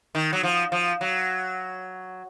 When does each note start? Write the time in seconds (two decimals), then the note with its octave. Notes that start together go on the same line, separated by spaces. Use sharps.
0.15 D#3
0.33 F#3
0.43 F3
0.72 F3
1.01 F#3